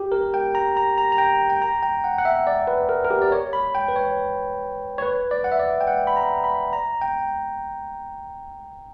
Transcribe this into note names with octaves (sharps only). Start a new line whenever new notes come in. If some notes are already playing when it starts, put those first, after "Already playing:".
Already playing: G4
A#4
G5
A#5
A#5
A#5
A#5
G5
G5
A#5
G5
F#5
F#5
E5
D5
B4
A#4
A#4
G4
D5
C#5
B5
G5
B4
C#5
C#5
B4
D5
F#5
E5
D5
G5
F#5
B5
A#5
B5
A#5
G5